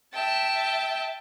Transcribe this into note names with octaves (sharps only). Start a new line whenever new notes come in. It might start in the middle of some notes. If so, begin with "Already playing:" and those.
E5 G5 A5